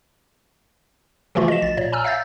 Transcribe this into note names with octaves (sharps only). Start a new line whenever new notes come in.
C#3 E3 F3 A3 F4 F#4
D#5 E7
A#1 A6
A#2 C#5 D5
G#5 A#5 E6 F6
E5 F5 E6 G6 A6